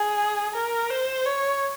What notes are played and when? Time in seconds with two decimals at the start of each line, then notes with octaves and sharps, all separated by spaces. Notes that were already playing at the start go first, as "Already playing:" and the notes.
Already playing: G#4
0.54 A#4
0.90 C5
1.25 C#5